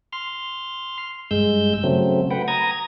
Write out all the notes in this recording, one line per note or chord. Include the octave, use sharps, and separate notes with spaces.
C6 F6
G2 G#3 E6 G6
C#3 F#3 A3 C4
B4 F#5 G5
A#5 D#6 G#6